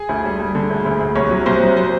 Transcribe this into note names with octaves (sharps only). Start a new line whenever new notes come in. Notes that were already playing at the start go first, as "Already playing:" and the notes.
Already playing: G#4
D2
G3
G3
D3
D2
D2
D2
C2 C#5
F#3
C2 C5
F#3
F#3 C5